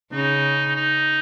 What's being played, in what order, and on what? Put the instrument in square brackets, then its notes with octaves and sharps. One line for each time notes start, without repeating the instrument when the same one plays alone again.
[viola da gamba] C#3 [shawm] D#4
[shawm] D#4